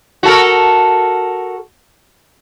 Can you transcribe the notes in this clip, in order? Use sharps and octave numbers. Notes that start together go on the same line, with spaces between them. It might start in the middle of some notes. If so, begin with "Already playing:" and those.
F#4 A4 A#4